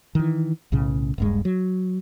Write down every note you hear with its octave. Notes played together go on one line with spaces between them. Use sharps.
D#3 E3
B1 A2 C#3
D#1 G2 G#3
F#3